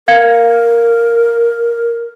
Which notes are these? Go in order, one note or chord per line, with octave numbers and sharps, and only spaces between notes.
A#4 F5 G#6 C#7